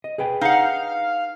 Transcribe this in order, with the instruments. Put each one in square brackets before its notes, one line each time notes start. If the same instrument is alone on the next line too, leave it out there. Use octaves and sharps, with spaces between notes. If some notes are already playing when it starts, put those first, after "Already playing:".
[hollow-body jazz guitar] D#5
G#4 B4 G5
[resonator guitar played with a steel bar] D#4 F#5 [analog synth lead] F5